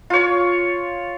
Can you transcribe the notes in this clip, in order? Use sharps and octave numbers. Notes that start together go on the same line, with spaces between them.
F4 C#5